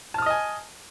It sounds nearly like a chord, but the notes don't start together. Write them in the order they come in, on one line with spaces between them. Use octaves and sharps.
A5 F6 D#6 D#5 G#5